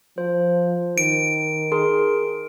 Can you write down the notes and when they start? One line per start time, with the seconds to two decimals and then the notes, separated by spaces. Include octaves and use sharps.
0.18 F3 C5
0.98 D#3 D7
1.72 G#4 A#4 C6